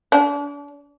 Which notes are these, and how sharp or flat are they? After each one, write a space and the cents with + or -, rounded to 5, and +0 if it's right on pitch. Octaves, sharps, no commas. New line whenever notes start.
D4 -40